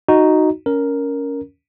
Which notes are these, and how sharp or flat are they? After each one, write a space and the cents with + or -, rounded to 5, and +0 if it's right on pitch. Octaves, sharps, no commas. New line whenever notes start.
D#4 +0 F#4 +0
C#4 +15 A#4 +0